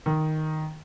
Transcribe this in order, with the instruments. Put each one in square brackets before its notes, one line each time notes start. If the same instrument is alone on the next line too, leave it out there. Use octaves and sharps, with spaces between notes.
[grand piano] D#3